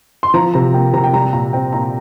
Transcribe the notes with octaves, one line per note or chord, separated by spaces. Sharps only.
C6
F3 A#5
C3 A#5
A#3 G5
C3 A#5
G5
G3 A#5
A#2 A#5
C4 G5
A#2 A#5